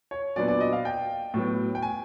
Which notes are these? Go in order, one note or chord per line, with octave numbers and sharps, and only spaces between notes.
C#5
A#2 F#3 B3 D4 D5
D5
D#5
F5
G5
A2 F#3 B3
G5
G#5